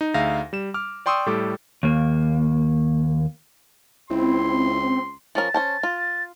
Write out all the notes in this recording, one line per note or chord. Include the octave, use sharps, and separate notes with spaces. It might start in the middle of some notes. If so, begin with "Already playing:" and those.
D#4
D2 D#4 G#4 E5 F5 A#6
G3 E7
D6 F6
D5 G5 C6 C#6 D#6 E6
A2 G3 A4 D6
D#2 A#3
C#2 C4 E4 C6
F3 C#4 A#4 A6
C#4 C5 A5
F4